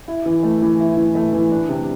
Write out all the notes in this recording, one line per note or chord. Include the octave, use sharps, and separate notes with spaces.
E4
E3
A3
E3
E4
E3
A3
E3
D4
C3